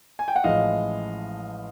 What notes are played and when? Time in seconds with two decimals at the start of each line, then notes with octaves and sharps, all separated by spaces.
0.19 G#5
0.28 G5
0.36 F#5
0.44 A1 A2 F3 G#3 D#5 F5